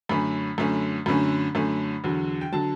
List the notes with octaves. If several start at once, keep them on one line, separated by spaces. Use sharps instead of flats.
F#2 D3 A3 C#4 B5
F#2 D3 A3 C#4
F#2 D3 A3 C#4 B5
F#2 D3 A3 C#4
E2 D3 F#3
G5
D3 F#3 A5